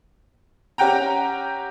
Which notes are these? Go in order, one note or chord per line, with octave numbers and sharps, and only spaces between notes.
C#4 G4 F#5 G5 A#5